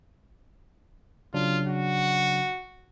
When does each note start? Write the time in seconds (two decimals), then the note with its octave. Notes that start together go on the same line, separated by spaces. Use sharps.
1.34 C#3 F#3 D4 F4
1.67 F#4